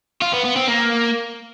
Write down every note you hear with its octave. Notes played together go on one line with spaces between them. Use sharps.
F4
B3
B3
C4
A#3